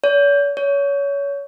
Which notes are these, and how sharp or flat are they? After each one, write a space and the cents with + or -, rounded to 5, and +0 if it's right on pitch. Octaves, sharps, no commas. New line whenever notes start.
C#5 +45
C#5 +25